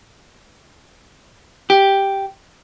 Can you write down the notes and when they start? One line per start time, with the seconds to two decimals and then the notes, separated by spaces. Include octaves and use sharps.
1.70 G4